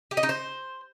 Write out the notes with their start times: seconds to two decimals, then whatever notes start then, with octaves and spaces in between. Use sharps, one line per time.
0.11 G4
0.17 D#5
0.23 D#4
0.29 C5